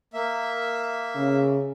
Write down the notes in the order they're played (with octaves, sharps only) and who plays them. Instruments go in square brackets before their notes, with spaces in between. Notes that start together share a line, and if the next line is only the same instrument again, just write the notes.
[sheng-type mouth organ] A#3 E5
[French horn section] C#3